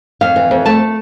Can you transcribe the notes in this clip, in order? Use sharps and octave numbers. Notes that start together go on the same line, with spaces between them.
F2 F5
E3
F2
A3 A5